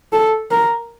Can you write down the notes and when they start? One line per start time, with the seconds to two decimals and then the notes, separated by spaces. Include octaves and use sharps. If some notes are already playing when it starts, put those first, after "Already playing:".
0.13 A4
0.51 A#4